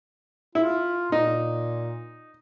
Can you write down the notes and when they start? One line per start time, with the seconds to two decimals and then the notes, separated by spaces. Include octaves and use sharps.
0.55 E4 F4
1.12 A#2 D#4